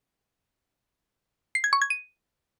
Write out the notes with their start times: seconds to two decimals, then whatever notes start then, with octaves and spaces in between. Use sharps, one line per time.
1.55 C7
1.64 G#6
1.73 C#6
1.82 G#6
1.90 D#7